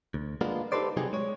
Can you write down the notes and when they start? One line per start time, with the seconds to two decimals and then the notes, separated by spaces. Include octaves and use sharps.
0.14 D2
0.41 G#3 A#3 B3 D4 F4
0.72 D#4 G4 A4 B4 C5 D5
0.97 C3 F#3 G3 C4 D#4 G#4
1.13 G#3 C#5